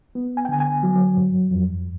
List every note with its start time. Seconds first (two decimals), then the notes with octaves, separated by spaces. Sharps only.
0.15 B3
0.37 G#5
0.45 G5
0.49 D3 G#5
0.60 G#5
0.83 F#3
1.17 G2
1.51 F2